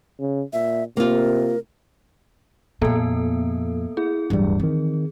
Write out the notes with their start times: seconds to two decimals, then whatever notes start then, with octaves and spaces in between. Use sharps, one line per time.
0.20 C#3
0.53 A#2 E5
0.97 C3 A#3 F4 A#4
2.82 F2 A#2 A#3 B3 A4
3.97 E4 G#4
4.30 D1 G2 E3 F#3 G3
4.60 D#3 E3 C4